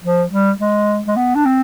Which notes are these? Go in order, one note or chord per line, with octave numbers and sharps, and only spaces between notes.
F3
G3
G#3
G#3
B3
D4
C4